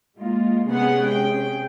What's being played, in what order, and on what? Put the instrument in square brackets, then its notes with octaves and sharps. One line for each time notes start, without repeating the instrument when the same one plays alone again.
[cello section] G#3 A#3 F4
[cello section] C3 C#4 G#4 [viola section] G#3 B3 F#5
[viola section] G5